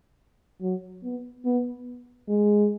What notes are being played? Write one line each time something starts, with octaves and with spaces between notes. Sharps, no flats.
F#3
B3
B3
G#3